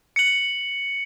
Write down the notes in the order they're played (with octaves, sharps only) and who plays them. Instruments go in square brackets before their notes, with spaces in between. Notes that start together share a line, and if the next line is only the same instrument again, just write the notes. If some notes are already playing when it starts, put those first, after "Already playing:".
[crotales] C#7 F#7